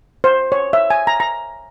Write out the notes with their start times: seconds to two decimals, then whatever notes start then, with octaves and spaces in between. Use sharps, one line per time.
0.24 C5
0.52 C#5
0.73 E5
0.90 G#5
1.07 A#5
1.20 A#5